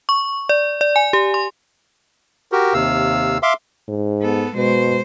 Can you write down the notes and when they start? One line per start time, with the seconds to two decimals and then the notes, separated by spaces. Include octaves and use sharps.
0.09 C#6
0.49 D5
0.81 D5
0.96 G#5
1.13 G4
1.34 C6
2.52 F#4 G4 A#4
2.74 D#2 C3 F5 E6
3.43 E5 F5 C6 D6
3.88 G#2
4.22 B3 A4
4.56 B2 G#3 C5